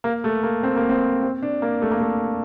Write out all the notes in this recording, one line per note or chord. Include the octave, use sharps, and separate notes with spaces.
A#3
A3
A#3
C4
A#3
C4
C4
D4
A#3
A3
A#3
A3